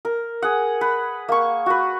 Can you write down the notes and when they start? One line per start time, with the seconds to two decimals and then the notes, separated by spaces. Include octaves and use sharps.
0.05 A#4
0.42 G#4 F#5
0.81 B4
1.29 A#3 C#6
1.66 F#4 B4